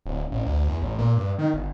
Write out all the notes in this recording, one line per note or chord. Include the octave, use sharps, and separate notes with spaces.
D1
A1
D2
E2
A1
A#2
G2
D#3
G1